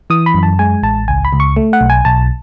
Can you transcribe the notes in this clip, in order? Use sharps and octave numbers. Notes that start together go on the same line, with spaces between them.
E3 D#6
B5
F#2
A5
G#3 G#5
A1 A5
C#2 G#5
B5
C#2
C#6
A3
F#5
B1
G#5
B1 A5